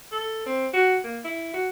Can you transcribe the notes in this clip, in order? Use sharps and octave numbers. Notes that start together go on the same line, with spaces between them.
A4
C4
F#4
A#3
E4
F#4